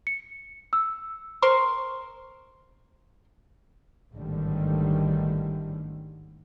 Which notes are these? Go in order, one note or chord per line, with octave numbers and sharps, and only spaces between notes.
C#7
E6
A#4 C5 C6 C#6
A1 G#2 D3 D#3 G3